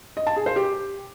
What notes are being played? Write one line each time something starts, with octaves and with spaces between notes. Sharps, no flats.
D#5
A5
G#4
C5
G4